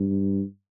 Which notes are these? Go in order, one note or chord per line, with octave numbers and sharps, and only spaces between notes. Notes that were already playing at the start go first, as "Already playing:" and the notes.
Already playing: G2